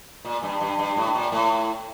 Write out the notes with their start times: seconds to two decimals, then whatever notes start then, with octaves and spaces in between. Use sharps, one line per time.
0.25 A#2
0.43 G2
0.61 G2
0.79 G2
0.96 A2
1.15 A#2
1.32 A2